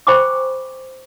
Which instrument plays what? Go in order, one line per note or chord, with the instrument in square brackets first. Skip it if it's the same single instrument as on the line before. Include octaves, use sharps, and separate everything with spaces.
[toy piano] C5 G5 G#5 B5 C#6 D6